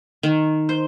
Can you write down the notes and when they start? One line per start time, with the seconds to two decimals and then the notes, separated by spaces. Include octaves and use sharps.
0.23 D#3
0.69 C5